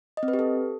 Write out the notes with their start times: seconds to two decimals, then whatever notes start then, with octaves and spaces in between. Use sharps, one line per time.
0.17 D#5
0.23 C4
0.28 B4
0.33 G4
0.39 A4